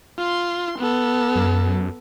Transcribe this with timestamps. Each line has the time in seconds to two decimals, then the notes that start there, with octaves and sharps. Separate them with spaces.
0.18 F4 C6
0.79 B3 A4
1.36 F#2